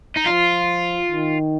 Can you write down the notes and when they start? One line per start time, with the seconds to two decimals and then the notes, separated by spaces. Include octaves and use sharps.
0.17 D#4
0.27 F3 F4
1.09 D#3